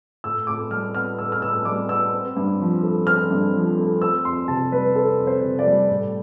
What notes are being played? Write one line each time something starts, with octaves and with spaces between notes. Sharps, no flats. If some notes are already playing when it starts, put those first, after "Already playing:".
A2 E6
A2 D6
G3 F6
B3 F6
A2 E6
F6
A2 E6
G3 D6
B3 E6
C4
G2
F3
A3
C4 F6
G2
F3
A3
C4 E6
F2 C6
C3 A5
G3 B4
C4 A4
F2
C5
C3
D5
G3
A2